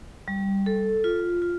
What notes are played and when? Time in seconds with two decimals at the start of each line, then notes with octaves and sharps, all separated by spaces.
0.28 G3
0.66 A4
1.04 F4
1.42 F4